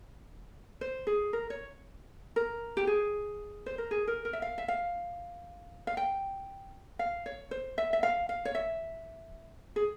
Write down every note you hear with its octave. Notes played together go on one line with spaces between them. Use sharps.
C5
G#4
A#4
C#5
A#4
G4
G#4
C5
A#4
G#4
A#4
A#4
E5
F5
E5
F5
F5
G5
F5
C#5
C5
E5
E5
F5
F5
C#5
E5
G#4